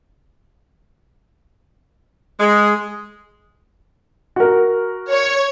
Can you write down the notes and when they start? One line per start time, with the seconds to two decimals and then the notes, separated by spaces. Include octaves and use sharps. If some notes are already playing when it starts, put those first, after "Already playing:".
2.40 G#3
4.36 F#4 A#4
5.11 C#5